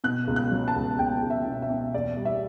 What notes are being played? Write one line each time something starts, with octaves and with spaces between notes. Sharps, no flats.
B2 F#6
C#2
F#6
F#3
A5
C#2
C#2 G5
C#2
E5
B2
E5
B2
E2 D5
G3
E5